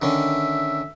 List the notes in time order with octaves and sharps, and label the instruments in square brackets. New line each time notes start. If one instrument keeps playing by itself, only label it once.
[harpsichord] D3 D#3 C#4 [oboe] E5